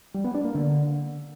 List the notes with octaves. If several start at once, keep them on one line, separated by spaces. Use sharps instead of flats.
G3
B3
D4
A#3
D3